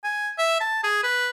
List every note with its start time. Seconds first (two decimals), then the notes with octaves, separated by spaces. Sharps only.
0.04 G#5
0.38 E5
0.60 A5
0.83 G#4
1.03 B4